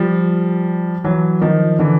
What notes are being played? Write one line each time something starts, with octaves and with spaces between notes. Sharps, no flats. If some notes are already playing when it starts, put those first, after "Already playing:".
Already playing: F3 G3
E3 F#3
D#3 F3
D3 E3